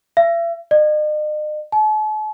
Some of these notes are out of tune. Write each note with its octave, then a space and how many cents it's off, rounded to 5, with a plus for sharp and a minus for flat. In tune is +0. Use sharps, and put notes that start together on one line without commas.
E5 +40
D#5 -45
A5 -45